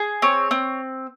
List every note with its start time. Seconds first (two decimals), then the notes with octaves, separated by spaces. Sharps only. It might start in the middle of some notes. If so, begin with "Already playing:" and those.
Already playing: G#4
0.22 C4 C#5
0.51 C4